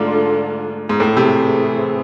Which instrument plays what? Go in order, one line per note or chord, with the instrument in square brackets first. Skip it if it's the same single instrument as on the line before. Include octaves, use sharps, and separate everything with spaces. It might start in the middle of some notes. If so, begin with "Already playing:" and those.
Already playing: [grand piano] G#2 [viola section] D3 A3 D4 F4 A4
[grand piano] G#2
[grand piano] A2 [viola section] E3 A3 C4 G#4
[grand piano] C3